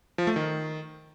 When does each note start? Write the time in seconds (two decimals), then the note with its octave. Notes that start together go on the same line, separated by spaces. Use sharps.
0.18 F3
0.27 A3
0.36 D#3